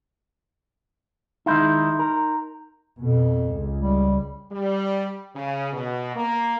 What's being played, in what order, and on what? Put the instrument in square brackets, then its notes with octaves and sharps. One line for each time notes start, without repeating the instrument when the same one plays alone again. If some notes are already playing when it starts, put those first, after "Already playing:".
[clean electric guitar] D#3 G#3 E4 [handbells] D#4 C6 G6
[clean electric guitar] A#4
[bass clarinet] F2 [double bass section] B2
[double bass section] C#2
[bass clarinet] G3
[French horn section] G3
C#3
B2
A#3